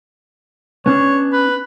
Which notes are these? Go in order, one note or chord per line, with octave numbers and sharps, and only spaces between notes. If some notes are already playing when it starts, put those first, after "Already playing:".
B3 C#4 D4 C#5
B4